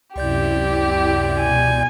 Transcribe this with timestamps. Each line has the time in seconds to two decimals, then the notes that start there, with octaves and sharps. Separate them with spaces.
0.16 C#2 F#2 C3 E4 G4 D5 G6
1.39 B2 G#5